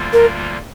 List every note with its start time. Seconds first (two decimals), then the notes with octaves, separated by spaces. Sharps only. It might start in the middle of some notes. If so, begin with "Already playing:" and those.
Already playing: D2 D3 G3 A#3 F4
0.13 A#4